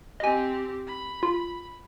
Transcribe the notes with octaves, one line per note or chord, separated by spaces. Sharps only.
C4 G4 D#5 G#5
B5
F4